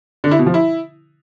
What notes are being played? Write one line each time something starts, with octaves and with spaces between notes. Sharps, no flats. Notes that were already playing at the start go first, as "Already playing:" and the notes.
D3
E4
B2
F3
E4